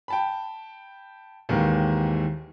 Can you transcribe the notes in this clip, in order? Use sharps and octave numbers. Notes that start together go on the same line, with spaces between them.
G5 A5 B5
D#2 G#2 D#3 E3